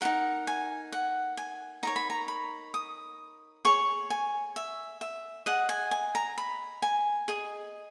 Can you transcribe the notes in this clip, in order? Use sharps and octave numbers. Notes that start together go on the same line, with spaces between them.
D#4 F#4 A#4 F#5
G#5
F#5
G#5
D#4 A#4 C#5 A#5
B5
A#5
B5
D#6
G#4 C#5 C#6
G#5
E5
E5
G#4 D#5 F#5
G#5
G#5
A#5
B5
G#5
G#4 D#5